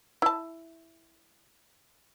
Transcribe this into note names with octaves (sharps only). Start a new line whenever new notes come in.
E4 A5